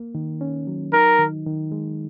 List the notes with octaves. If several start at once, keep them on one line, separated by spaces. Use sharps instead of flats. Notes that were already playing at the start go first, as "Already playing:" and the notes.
Already playing: A#3
D#3
C#4
F#3
D#4 A#4
D#3
D#3
G#3